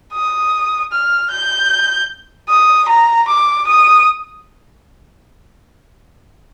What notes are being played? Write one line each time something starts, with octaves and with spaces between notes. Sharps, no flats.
D#6
F6
G6
D#6
A#5
D6
D#6